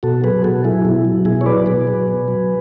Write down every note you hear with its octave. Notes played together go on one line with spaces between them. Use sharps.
B2 F#4 A4
F#3 G#4 B4
B2 F#4 A4
F#3 E4 G#4
B2 E4
F#3
B2 E4 G#4
C#5
F#3 B4 D5
B2 G#4 B4
F#3
B2
F#3